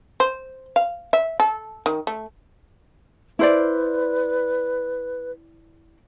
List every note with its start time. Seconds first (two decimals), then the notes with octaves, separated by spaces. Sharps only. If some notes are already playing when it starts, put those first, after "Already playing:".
0.20 C5
0.76 F5
1.13 E5
1.40 A4
1.86 D#3
2.07 A3
3.39 E4 B4 C5 D5